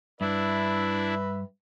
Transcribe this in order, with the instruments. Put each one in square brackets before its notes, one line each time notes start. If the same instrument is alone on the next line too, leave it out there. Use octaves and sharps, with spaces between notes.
[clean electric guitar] G2 [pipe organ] D4 E4 [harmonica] B4 E5